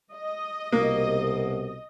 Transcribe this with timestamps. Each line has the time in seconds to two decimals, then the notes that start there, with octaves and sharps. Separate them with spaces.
0.13 D#5
0.72 C2 B2 A#3